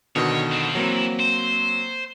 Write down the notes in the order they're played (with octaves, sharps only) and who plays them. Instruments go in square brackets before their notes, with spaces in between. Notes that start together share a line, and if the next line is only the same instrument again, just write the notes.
[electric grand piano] B2 D3 D#3 [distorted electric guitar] C#5
[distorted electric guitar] C4 F4
[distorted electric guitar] E3 [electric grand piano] F#3 A#3 C4
[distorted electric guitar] C5